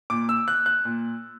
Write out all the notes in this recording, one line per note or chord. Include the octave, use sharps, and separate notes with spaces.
A#2 D6
E6
F#6
F#6
A#2